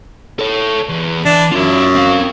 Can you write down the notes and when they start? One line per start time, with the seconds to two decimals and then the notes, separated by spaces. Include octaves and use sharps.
0.39 A4 C#5
0.89 E2
1.25 E3 D4
1.52 F#2 F4 E5
1.95 C4 F5